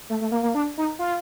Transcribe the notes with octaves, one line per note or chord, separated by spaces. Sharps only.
A3
A3
A#3
A#3
D4
D#4
F4